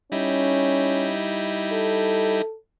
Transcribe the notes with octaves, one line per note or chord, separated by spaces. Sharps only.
G3 C#4 D#4 E4
A4